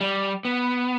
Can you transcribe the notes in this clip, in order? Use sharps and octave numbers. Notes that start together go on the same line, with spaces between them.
G3
B3